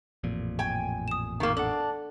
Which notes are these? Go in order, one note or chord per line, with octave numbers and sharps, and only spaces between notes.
A1 F2 A#2
G5 G#5
D#6 E7
D#3 A#3
D4 A4 F#5